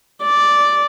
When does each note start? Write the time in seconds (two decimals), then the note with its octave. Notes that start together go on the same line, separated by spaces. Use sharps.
0.23 D5